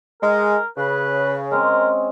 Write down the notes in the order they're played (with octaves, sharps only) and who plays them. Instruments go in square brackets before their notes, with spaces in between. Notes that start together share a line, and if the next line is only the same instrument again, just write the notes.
[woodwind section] G#3 [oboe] A#4
[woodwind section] C#3 [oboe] B4
[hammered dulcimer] G#3 C4 C#4 [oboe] A#4